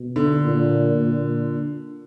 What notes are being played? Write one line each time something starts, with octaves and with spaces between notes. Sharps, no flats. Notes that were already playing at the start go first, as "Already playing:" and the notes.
Already playing: B2
D3
A#2
A#2